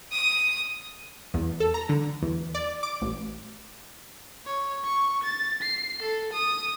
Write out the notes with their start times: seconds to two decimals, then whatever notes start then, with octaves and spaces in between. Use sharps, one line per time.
0.12 D#6
1.34 E2
1.60 A4
1.74 A#5
1.89 D3
2.22 E2
2.55 D5
2.83 D6
3.01 A1
4.46 C#5
4.84 C#6
5.24 A6
5.62 C7
6.02 A4
6.33 D#6